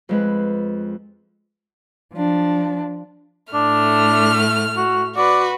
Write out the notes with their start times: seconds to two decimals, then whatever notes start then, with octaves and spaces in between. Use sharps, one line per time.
0.09 F2 G#3 B4
2.13 F3 D4
3.54 A2 A3 D4 F6
4.77 F#4
5.17 F#4 B4 D5